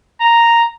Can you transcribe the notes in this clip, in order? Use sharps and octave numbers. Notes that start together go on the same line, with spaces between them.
A#5